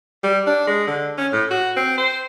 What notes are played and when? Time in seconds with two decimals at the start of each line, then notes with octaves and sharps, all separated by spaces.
0.24 G3
0.47 D4
0.68 G#3
0.88 D3
1.18 C#4
1.33 A2
1.51 F#4
1.77 C4
1.98 C5